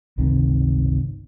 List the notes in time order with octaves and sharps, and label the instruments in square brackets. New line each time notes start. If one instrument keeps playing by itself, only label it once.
[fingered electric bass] G1 C#2 C3 D#3